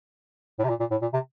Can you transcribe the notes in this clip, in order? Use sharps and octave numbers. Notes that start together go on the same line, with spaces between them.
A2
C3
A#2
A#2
A2
A#2
C3